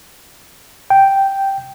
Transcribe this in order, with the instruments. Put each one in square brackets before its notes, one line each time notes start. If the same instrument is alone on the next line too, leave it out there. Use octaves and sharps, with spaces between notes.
[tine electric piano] G5